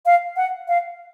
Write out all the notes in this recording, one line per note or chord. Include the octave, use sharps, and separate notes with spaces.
F5
F#5
F5